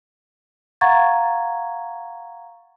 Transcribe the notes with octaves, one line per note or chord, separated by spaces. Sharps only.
F5 F#5 A#5 C#6 G#6 A6